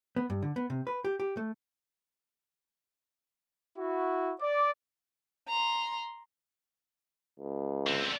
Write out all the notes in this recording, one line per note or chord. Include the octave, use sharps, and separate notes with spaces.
B3
G2
D3
B3
C3
B4
G4
G4
A3
E4 F#4
D5
A#5 C6
C#2
D3 C4